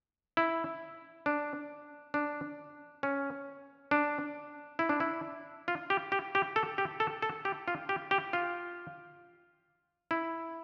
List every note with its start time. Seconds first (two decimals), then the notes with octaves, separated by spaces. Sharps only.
0.37 E4
1.26 D4
2.14 D4
3.03 C#4
3.91 D4
4.79 E4
4.89 D4
5.00 E4
5.68 F4
5.90 G4
6.12 G4
6.35 G4
6.56 A4
6.78 G4
7.00 A4
7.22 A4
7.45 G4
7.68 F4
7.89 G4
8.11 G4
8.33 F4
10.11 E4